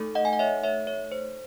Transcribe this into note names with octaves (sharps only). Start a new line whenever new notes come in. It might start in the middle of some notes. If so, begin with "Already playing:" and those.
Already playing: A3 D#4 A4
D#5 F#5
G#5
F#5
C#5 E5
C#5 E5
C#5
C5